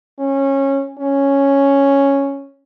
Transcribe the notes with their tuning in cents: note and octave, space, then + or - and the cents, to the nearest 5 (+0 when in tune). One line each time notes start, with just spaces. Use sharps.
C#4 -20
C#4 +0